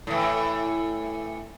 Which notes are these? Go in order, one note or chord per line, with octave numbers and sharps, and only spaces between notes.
A2 E3